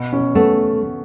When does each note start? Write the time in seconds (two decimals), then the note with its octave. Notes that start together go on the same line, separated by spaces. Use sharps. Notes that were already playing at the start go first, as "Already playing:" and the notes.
Already playing: B2
0.13 C#4
0.35 A3 B3